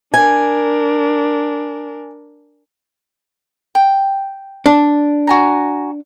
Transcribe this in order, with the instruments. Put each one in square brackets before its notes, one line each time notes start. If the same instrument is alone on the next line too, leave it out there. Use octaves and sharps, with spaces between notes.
[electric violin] D4 A#4 [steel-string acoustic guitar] G#5
[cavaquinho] G5
[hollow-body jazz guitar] D4
[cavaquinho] F#4 G#5 A#5